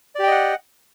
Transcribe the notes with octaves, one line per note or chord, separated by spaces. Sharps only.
G4 D5 D#5 F#5 G5